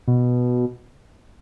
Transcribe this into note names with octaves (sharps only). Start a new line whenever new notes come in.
B2